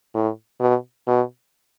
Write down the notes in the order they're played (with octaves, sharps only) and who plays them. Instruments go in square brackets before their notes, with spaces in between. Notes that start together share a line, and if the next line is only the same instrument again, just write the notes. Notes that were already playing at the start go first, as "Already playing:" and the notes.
[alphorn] A2
B2
B2